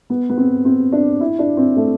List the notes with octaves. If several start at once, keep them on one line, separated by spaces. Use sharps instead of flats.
B3
B3
C4
C4
D4
E4
D4
C4
A3